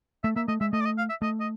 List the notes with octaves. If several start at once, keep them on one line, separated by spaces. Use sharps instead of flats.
A3 E5
A#3 E5
A3 D#5
G#3 E5
A3 D#5
D5
D#5
F5
E5
A3 D#5
D#5